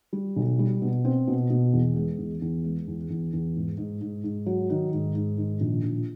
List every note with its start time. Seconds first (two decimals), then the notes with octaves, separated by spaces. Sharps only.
0.13 G3
0.36 B1
0.59 G3
0.82 B2
1.05 C4
1.27 B2
1.50 B2
1.73 E2
1.96 G#3
2.19 E2
2.42 E2
2.64 G#3
2.88 E2
3.10 E2
3.33 E2
3.56 G#2
3.78 G#2
4.01 G#2
4.24 G#2
4.46 F#3
4.70 D#3
4.93 G#2
5.15 G#2
5.37 D#3
5.61 A#1
5.84 A#1